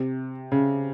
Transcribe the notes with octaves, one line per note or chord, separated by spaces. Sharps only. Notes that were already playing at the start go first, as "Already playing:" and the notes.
Already playing: C3
C#3